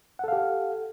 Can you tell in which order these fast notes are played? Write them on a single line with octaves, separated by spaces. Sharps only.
F#5 A4 F5 G4